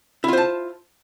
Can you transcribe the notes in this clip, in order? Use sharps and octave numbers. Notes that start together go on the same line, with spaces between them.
E4 F4 C5 A5